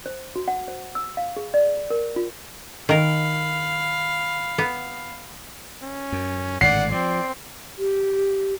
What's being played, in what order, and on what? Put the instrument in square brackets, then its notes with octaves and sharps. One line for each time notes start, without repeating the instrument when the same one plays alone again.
[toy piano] C5
F#4
F#5
C5
E6
F5
G#4
D5
A#4
F4
[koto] D#3 A#4 [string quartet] F5 B5
[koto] B3
[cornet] C#4
[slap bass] F#2
[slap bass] G#1 A2 D3 [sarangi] D5 [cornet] F#5 [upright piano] C7
[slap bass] F3 [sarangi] C4 [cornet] D5
[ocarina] G4